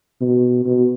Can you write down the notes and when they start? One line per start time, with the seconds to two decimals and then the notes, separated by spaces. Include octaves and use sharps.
0.21 B2
0.66 B2